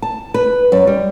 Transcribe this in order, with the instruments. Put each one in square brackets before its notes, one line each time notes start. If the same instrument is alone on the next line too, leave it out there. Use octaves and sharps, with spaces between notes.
[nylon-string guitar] A5
B4
F#2
G3